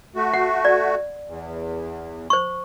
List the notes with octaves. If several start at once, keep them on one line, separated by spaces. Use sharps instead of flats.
A3 F#4
F#5
D5
E2
C5 C#6